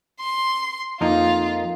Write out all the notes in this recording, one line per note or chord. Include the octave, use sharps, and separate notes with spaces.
C6
F2 A#3 D#4 F4